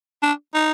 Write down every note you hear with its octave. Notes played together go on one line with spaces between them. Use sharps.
D4
D#4